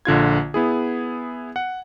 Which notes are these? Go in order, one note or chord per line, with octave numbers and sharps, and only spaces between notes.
A#1 D3 F4 G#6
B3 E4 G#4
F#5